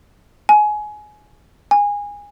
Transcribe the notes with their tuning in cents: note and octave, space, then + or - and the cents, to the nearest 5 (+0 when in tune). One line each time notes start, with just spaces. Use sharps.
G#5 +20
G#5 -20